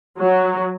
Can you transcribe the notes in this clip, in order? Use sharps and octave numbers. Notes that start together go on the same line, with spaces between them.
F#3